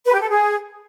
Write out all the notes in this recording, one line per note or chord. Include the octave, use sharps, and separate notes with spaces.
B4
G4
A4
G#4